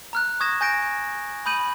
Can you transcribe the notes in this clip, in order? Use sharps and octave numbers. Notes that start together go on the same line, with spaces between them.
A#5 F6 F#6
C#6 D#6 G#6 A#6 E7
G#5 G6 A#6 D7
B5 D#6 G6 D#7 F#7